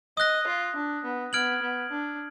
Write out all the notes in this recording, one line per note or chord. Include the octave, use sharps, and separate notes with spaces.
D#5 D#6 F#6 A#6
F4
D4
B3
B3 F6 G#6 D7 F#7
B3
D4